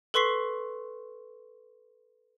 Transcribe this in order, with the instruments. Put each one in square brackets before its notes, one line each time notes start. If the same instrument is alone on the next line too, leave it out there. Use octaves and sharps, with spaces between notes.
[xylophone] A4 B4 C6 C#6 B6 C7